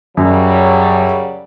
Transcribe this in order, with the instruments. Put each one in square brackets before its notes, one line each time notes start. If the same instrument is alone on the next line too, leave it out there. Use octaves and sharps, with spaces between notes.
[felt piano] F#2 [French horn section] C#3 F#3 G3